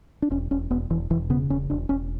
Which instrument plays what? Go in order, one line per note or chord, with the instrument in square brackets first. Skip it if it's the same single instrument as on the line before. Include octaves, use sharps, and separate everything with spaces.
[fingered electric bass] D4
E1 C#4
E1 C#4
E1 B3
E1 E3
E1 E3
C#3 B3
E1 C#4
E1 D4
E1 C#4